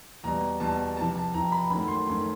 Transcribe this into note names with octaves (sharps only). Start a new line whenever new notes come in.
E2 B2 G3 A#5
E2 B2 G3 A5
F2 C3 E3 A5
A5
F2 C3 E3 A#5
B5
F#2 D#3 F#3 A3 B5
C6
F#2 D#3 F#3 A3 C6